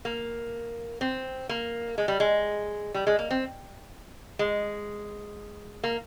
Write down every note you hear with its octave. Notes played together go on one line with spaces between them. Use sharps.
A#3
C4
A#3
G#3
G3
G#3
G3
G#3
A#3
C4
G#3
A#3